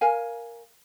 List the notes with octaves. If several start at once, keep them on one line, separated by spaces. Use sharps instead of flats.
A#4 F5 G#5